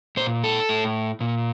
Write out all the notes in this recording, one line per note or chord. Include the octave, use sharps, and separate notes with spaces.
A#2 C5
A4
A2
A#2